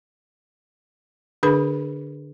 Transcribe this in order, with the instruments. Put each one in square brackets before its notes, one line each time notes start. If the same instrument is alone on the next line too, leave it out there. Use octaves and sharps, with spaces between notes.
[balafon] D3 D4 G#4 B4 B5